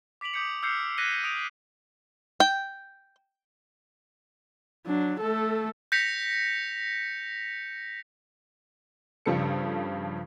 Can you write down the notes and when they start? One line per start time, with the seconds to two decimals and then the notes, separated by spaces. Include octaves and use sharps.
0.21 D6 B6 D7 F7 F#7
0.34 D6 D#6 G6 B6 C#7
0.62 D6 E6 F6 G6 C7 C#7
0.98 F#6 G#6 A#6 B6 D#7 G7
1.24 D#6 D7 F7
2.40 G5
4.86 F#3 D4
5.20 A3 A4
5.92 G6 A#6 B6 C#7 F7
9.26 G2 C#3 F3 G3 A4 C#7